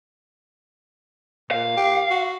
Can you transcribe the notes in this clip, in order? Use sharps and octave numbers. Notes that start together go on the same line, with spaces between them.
A#2 F5
G4
F#4